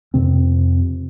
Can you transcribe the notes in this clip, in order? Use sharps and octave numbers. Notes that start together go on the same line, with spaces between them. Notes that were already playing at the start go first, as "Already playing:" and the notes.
F2 C3 C4